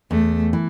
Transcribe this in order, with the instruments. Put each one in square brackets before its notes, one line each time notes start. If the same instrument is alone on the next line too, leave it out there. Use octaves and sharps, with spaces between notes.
[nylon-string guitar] E2 [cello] A3
[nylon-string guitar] E3